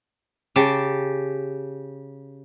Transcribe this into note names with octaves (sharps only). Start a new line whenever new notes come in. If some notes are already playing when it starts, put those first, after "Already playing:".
C#3 G4 A5